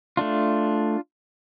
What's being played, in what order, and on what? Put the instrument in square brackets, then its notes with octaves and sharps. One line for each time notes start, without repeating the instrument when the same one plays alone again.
[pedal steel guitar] A3 D4 F4